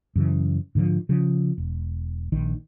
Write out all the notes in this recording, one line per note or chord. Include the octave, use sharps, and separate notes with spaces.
F#2 C#3 E3
G#2 D3 E3 F3
C#3 F3
E1
A#1 D#3